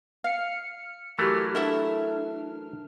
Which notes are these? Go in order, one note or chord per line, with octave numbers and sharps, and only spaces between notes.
F5 F6 C#7
E3 F#3 A3 G4 A#4 F6
D4 E4 A4 E5